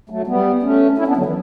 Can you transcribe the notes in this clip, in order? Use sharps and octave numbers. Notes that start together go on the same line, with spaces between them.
F#3 A3
G3 B3
A3 C#4
C#4 E4
B3 D4
D3 F#3
E3